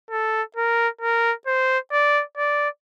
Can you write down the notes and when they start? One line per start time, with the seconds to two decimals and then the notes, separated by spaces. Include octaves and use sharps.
0.11 A4
0.56 A#4
1.01 A#4
1.47 C5
1.92 D5
2.37 D5